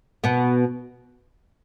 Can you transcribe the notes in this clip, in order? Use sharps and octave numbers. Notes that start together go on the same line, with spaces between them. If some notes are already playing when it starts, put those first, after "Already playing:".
B2 B3